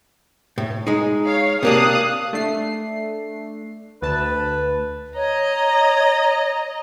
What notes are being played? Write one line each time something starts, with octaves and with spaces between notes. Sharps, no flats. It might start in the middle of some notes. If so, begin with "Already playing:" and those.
A2
G#3 D#4
C#5 F5
C3 A#3 D4 F5 D#6 F#6
A3 D4 C7
D2 B4 A5
C#5 D#5 A#5